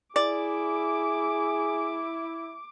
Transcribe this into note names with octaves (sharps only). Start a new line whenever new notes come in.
E4 G#4 D5 D6